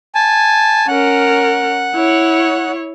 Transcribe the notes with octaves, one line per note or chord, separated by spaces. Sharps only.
G#5 A5
C#4 A#4 F#5
E4 C#5